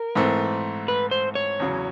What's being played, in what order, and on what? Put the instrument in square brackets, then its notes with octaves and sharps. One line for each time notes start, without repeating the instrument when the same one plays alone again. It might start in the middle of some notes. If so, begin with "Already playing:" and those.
Already playing: [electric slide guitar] A#4
[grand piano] G#2 E3 A3 C4
[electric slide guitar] B4
C5
C#5
[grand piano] E2 C#3 F#3